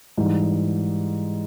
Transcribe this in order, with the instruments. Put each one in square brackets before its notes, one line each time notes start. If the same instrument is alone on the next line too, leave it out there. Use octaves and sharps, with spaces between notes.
[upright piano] G#2 E3 G3